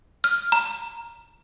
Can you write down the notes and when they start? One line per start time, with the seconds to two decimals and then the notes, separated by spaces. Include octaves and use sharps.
0.24 F6
0.52 A#5